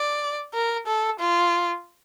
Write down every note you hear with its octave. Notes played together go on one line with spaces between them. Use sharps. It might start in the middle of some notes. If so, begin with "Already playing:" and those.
Already playing: D5
A#4
A4
F4